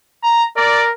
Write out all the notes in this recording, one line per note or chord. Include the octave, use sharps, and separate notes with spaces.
A#5
A#4 D5